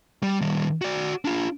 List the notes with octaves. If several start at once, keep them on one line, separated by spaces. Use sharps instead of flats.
G3
D#3 G3
F#4 D5
D4 F4